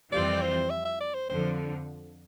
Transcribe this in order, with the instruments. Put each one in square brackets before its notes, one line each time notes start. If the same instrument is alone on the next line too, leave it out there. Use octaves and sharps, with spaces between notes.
[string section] F2 E3 G3 C4 F4 [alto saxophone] D5
[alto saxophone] C5
E5
E5
D5
C5
[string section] F2 D3 F3 [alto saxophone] C5